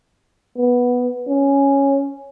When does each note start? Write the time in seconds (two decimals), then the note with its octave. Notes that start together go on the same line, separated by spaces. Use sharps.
0.58 B3
1.29 C#4